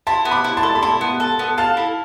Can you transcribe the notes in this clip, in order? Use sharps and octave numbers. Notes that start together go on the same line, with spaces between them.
E4 A5 C6
B3
B5 D6
E4
A5 C6
A4
B5
E4 A5 C6
B3
A4
B3
A4 F5 A5
E4